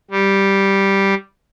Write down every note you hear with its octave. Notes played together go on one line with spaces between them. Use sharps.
G3